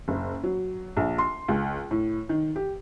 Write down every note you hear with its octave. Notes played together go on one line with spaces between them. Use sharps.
F#1
F#3
A#1
C6
C#2
A2
D#3
G4